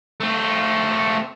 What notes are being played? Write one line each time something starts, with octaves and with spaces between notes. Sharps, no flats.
A3 C4